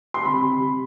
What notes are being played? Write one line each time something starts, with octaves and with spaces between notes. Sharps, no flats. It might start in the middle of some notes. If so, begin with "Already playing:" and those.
C6
C3 B5
C3
C3